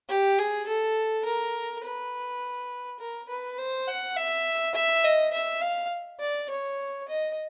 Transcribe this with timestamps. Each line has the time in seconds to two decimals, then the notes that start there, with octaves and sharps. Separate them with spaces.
0.09 G4
0.38 G#4
0.67 A4
1.25 A#4
1.84 B4
2.99 A#4
3.29 B4
3.58 C5
3.88 F#5
4.16 E5
4.75 E5
5.04 D#5
5.33 E5
5.61 F5
6.20 D5
6.50 C#5
7.08 D#5